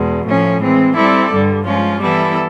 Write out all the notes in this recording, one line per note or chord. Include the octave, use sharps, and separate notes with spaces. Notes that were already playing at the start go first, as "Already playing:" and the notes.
Already playing: E2 B2 G#3
A2 F3 A3 C#4
E3 G#3 C4
G3 C4 E4 A4 D5
G2 D3 G3
F3 G#3 C#4 F4
E3 G3 B3 E4 A4